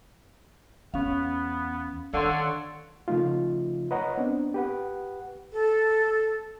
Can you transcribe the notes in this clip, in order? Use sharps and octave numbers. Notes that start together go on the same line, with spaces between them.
E2 B3 C#4 F5
D3 D#3 A4 C#5 F5 F#5 C6
C#3 F3 A3 D#4 F4
B4 C#5 D#5 F#5 A#5
B3 C4 D4
G4 B4 F#5
A4